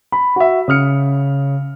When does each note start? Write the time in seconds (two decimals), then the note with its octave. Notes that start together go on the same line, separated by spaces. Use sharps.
0.12 B5
0.36 F#4 E5
0.68 C#3 D#6 F6 C#7